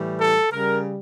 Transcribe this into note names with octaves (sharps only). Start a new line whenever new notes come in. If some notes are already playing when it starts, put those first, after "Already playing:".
Already playing: A2 E3 G3
A4
C#3 G3 A#4